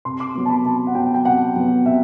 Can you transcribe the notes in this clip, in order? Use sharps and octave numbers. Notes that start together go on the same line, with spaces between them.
C3 C6
D6
F#3 B3
A5
B5
C3 A5
F#5
F#3 B3 G5
G5
C3 F#5
F#3 B3
C3 E5